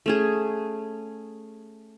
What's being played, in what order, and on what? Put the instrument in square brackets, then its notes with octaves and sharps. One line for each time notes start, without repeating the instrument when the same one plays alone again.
[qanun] A3 C#4 G#4